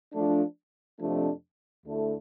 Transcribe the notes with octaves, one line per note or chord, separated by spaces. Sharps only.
F3 A3 D4
F2 C3 F3 A3 D4
D2 D3 A3 E4